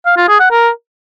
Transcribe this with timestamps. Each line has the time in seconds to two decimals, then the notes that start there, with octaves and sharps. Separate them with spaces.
0.06 F5
0.17 F4
0.28 G#4
0.40 F#5
0.51 A#4